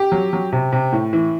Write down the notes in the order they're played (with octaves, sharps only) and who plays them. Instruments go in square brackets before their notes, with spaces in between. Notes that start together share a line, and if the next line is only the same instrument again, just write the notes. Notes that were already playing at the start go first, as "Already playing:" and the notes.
Already playing: [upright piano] G4
F#3
F#3
C3
C3
A2
E3